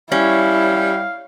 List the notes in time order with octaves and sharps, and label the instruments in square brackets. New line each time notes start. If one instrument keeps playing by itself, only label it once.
[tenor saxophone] G3 [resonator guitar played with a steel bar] C#4 [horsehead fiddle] E4 [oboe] F5